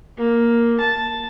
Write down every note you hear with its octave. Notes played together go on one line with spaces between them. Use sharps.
A#3
A5